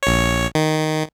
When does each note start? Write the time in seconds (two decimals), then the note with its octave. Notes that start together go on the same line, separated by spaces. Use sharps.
0.03 A#1 C#5
0.55 D#3